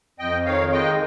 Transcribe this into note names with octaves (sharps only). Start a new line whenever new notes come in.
F2 D#5 G5
D#3 C#5 F5
G#3 D#5 G5